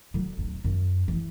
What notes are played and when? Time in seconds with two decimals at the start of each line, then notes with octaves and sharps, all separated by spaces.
0.14 D3 F#3
0.37 D1 D#4
0.64 F#2
1.08 E3